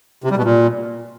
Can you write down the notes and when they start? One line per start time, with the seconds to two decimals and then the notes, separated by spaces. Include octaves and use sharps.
0.24 C3
0.31 G3
0.37 B2
0.44 A#2